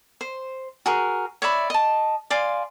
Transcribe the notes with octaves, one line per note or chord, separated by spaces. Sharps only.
C5
F#4 G#4 A#4
C#5 D5 E5 B5
D#5 A5
D5 F5 G#5 C6